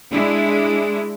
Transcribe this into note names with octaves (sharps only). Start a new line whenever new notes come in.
G#3 D4 E4